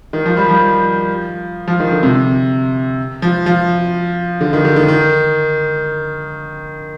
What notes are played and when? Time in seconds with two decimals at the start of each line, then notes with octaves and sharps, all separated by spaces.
0.13 D#3
0.26 F3
0.37 G3
0.49 F3
1.68 F3
1.80 D#3
1.92 D3
2.03 C3
3.22 F3
3.46 F3
4.41 D3
4.53 D#3
4.65 D3
4.76 D#3
4.88 D#3